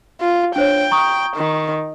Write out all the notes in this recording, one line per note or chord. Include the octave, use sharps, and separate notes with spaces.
F4
D4 C5 C#5 G5
A#5 C#6 D#6
D#3